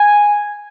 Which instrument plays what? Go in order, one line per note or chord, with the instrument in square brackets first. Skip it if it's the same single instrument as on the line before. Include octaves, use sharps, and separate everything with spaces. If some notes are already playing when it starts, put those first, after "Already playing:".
Already playing: [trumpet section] G#5